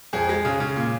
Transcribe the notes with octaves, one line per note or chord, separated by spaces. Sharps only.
F2 G#4
G#3
C#3
C#3
A#2